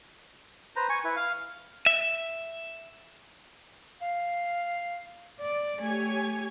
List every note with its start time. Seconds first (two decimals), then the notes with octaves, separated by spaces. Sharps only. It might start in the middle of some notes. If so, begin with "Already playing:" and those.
0.76 B4 C5 A#5
0.89 G#5 C#6
1.04 E4 B4
1.16 F5
1.86 E5
4.01 F5
5.41 D5
5.82 A3 G4 C#5 G#5